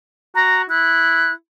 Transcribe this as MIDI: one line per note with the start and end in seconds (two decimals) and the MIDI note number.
0.35 0.63 66
0.35 0.62 82
0.70 1.31 64
0.70 1.32 90